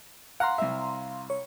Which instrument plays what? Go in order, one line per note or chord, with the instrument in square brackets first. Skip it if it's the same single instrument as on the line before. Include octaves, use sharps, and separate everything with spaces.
[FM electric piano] F5 A#5 C6 [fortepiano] F#5
[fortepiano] C2 E5
[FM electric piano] C#5